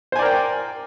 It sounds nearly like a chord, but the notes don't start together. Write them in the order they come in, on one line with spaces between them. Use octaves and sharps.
C5 G#5 D5 A#4 G5